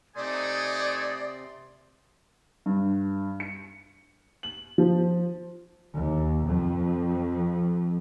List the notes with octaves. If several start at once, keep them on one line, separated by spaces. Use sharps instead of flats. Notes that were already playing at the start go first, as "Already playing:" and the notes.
C3 A3 D#4 D5 G#5 C6 D#6
G2
C#7
F#7
F3
D#2
F2